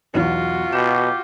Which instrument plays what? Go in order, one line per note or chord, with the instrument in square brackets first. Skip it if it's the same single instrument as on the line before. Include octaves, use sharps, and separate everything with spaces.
[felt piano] B1 E2 [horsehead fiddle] F4 F#4
[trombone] B2 [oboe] G4 [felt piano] E7